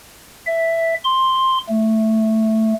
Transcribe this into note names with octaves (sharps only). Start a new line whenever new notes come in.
E5
C6
A3